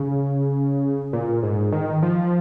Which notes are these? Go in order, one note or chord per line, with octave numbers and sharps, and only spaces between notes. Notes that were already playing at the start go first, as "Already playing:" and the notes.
Already playing: C#3
A#2
G#2
D#3
F3